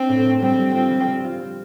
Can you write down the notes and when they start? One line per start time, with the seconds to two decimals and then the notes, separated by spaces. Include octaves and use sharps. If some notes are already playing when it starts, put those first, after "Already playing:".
Already playing: C4 D4
0.09 A2
0.25 A3
0.42 G3 C4
0.58 G3
0.75 C4 F4
0.91 G3
1.07 G3
1.24 F4
1.40 C4